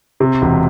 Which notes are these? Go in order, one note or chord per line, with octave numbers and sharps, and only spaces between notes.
C3
E1